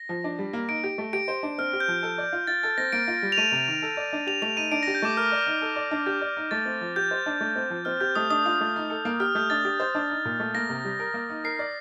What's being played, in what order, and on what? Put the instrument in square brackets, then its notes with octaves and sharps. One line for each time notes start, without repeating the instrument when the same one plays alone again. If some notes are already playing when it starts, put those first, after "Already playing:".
Already playing: [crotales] A#6
[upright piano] F3
D4
G3
A#3
[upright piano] D#4 [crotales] D7
[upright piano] G4
A3
[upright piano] G4 [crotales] D7
[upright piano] C5
D4
[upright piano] C4 [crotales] F6
[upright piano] G4
[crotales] G6
[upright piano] F3
A4
D5
F4
[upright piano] F4 [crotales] A6
[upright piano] A4 [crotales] A6
[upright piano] C4 [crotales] A#6
[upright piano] A#3 [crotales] D7
[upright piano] F4
G3
[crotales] F7
[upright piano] A3 [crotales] D#7
[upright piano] C3
D#3
A4
D5
D4
[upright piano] G4 [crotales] F7
[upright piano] A3 [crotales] F7
[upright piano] D#4 [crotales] D#7
[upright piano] D4 [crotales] D7
[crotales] A#6
[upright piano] G4
[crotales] G6
[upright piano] A3 [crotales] D6
[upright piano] A#4 [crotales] F6
[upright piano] D5
D#4
A4
D5
D4
[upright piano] G4 [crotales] G6
[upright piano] D5
D#4
[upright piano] A3 [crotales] A6
[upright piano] C4
F3
[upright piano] G4 [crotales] G6
[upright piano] C5
D4
A3
C4
F3
[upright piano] C4 [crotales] F6
[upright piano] G4 [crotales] G6
[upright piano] A3 [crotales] D#6
[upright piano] D4 [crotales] D#6
[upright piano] F4
A3
D#4
A4
A#3
[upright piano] G4 [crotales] F6
[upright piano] A3 [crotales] G6
[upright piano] D4 [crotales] A6
[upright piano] G4
C5
D4
D#4
A#2
A3
[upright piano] A#3 [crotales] A#6
[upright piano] C3
G3
A#4
A#3
D#4
[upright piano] A#4 [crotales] C7
[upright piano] D5